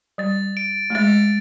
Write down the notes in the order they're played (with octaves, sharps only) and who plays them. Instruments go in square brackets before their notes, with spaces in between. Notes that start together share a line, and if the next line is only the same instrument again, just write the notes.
[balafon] G3 [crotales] A6
[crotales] D7
[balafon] A3
[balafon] G#3 [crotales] A6